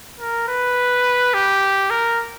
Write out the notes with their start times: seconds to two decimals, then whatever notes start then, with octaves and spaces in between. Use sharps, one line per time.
0.20 A#4
0.48 B4
1.34 G4
1.90 A#4